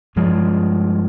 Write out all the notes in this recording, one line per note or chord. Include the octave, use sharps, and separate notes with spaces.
G2 F3 G#3